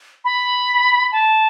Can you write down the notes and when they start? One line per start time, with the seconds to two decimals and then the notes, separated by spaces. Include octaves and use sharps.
0.25 B5
1.12 A5